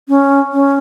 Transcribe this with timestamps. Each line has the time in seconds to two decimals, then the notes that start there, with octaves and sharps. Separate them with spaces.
0.09 C#4
0.53 C#4